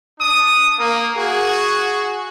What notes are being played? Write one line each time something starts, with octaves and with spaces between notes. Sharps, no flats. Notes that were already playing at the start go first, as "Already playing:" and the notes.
D4 D#6
A#3
F#4 G#4